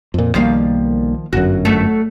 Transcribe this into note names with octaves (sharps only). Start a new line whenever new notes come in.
F2 A#2
B1 D#3 F3 G3 A#3 F5
G1 F#2 F#4
F#3 A3